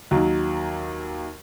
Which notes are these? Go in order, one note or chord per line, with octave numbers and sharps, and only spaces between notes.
D#2 D#3 F#3